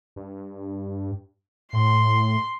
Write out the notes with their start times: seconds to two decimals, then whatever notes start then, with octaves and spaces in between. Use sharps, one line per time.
0.16 G2
1.73 A2 C6